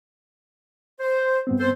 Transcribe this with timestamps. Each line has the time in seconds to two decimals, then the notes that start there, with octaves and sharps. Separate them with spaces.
0.99 C5
1.47 G2 B3 C4
1.59 A4 C5